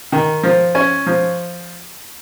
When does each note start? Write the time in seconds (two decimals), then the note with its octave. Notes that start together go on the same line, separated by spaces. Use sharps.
0.12 D#3
0.43 F3
0.75 C#4
1.07 F3